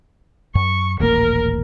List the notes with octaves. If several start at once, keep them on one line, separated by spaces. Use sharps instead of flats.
F#2 C#6
D#1 A1 A#3 A#4